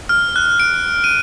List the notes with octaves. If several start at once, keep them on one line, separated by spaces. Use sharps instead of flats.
F6
F#6
D7
D#7